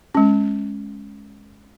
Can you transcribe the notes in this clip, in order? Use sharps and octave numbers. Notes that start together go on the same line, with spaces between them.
G#3 C#4